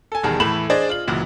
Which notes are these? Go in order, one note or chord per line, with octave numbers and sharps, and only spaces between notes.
A4 G#5
E1 E2 D#3 G3 G#4 A5
A2 E3 A4 B5 E7 F#7
D4 G#4 C5 D5 D#5
F4 F#7
C#2 A#2 E3 F#3